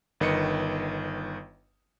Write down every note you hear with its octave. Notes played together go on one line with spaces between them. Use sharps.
G1 D#3 B4 D#5 C#7